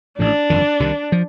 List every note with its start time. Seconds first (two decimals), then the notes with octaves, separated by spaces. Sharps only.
0.18 A1 A2 F3 D4
0.50 G1 F2 D#3
0.80 C2 C3 D#3
1.12 F3